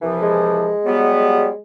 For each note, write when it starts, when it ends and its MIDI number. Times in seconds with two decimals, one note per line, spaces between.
0.02 0.71 36
0.02 0.71 52
0.02 0.71 53
0.23 1.59 56
0.85 1.48 54
0.85 1.48 55
0.85 1.48 59